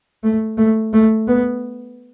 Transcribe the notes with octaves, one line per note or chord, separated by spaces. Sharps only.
A3
A3
A3
B3